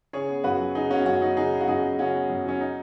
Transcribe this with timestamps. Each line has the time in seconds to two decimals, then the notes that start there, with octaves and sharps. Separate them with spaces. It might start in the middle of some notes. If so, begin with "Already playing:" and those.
0.13 C#3 G#4 C#5
0.29 B3
0.44 F#2 F#4 B4
0.60 F#3
0.75 C#3 D#4 G#4
0.90 B3 C#4 F#4
1.05 F#2 C#4 F#4
1.21 F#3 D#4
1.37 C#3 D#4 G#4
1.52 B3
1.61 F#4
1.68 F#2 D#4 G#4
1.83 F#3
1.99 C#3 C#4 F#4
2.14 B3
2.29 F#2
2.45 F#3 C#4
2.61 D#4